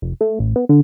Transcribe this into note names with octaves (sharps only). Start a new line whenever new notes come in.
F1
A3
A1
B3
D3